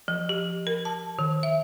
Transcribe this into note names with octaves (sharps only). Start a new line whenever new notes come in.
F3
G4
A#4
A5
D#3
E5